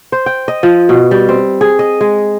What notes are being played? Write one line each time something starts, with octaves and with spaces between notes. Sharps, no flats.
C5
G5
D#5
F3
B2
G3
C4
G#4
D#5
G#3